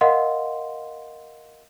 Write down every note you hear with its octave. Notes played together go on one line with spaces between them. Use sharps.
A#4 D#5 F5 F#5 C6